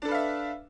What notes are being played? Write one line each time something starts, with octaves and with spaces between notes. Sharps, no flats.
D4 A4 B4 E5 F5